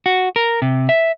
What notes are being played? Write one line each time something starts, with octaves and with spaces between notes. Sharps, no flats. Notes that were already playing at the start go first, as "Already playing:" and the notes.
F#4
A#4
C3
E5